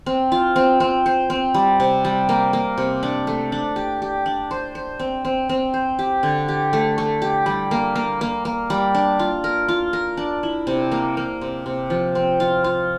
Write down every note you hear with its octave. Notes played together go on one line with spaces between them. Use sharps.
C4
F4
C4
C4
C5
C4
G3
C3
G3
A#3
A#3
C3
D4
A3
D4
G4
G4
D4
C5
C5
C4
C4
C4
C5
G4
D3
G4
A3
A3
G4
G3
A#3
A#3
A#3
A#3
G3
D4
F4
A#4
F4
A#4
D4
E4
C3
A#3
A#3
C3
C3
F3
C4
F4
F4